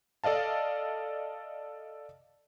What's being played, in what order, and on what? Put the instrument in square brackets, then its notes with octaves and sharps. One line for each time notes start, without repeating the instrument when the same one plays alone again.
[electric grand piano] A4 D5 D#5 F5 A5